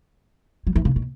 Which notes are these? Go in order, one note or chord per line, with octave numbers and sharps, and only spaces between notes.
F#3
E3
C#3
B2